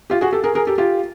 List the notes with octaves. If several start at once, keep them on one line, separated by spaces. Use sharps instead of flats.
F4 G4
F#4 G#4
G4 A4
G#4 A#4
G#4 A#4
G4 A4
F4 G4